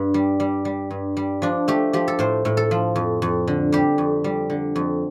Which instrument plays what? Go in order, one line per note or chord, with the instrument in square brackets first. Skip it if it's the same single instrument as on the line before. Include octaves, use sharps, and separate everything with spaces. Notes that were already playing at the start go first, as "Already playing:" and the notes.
Already playing: [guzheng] G2
G3
G3
G3
G2
G3
F3 D4
A3 G4
F3 G4
A4
A2 C5
A2
A4
F3
F2
F2
D3
G3 G4
F2
G3
D3
F2